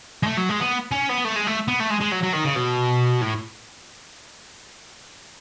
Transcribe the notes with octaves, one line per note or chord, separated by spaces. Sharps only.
G#3
A3
F#3
G#3
B3
C#4
B3
A3
G#3
A3
B3
A3
G#3
G#3
F#3
F#3
D#3
C#3
B2
A2